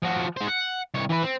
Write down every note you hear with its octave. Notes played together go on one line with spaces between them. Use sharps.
F3 F#4
G#3 C5
F#5
C2 C#5
E3 B4
C4